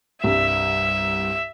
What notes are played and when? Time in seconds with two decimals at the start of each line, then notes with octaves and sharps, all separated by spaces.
0.24 C2 G2 E5